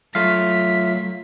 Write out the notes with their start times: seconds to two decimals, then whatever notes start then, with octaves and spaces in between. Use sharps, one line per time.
0.15 F#3 A3 F4 F5 B6